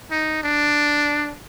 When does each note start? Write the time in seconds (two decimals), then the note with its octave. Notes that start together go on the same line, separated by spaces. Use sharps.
0.11 D#4
0.43 D4